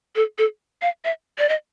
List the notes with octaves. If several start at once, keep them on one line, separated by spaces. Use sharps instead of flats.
A4
A4
F5
E5
D5
D#5